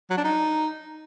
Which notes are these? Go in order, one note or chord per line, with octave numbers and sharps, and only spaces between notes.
F#3
D4
D#4